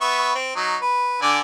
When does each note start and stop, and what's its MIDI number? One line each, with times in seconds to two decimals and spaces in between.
0.01 0.33 59
0.01 0.33 76
0.01 0.33 85
0.35 0.55 60
0.56 0.76 54
0.56 0.76 63
0.82 1.21 71
1.22 1.40 50
1.22 1.40 74
1.22 1.40 80